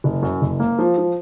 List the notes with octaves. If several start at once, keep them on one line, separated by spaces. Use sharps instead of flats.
F#1
F#2
F#1
A#3
F3
F3